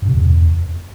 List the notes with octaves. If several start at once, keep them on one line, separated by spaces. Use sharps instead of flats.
G2
C3
E2